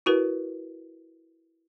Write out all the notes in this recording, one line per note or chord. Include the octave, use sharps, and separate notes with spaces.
E4 F#4 A#4 B4